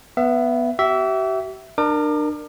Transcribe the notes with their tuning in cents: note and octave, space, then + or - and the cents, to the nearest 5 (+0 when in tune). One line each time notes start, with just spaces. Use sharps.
B3 +0 E5 +30
G4 -45 E5 +0
D4 +30 A#4 +0 D6 +35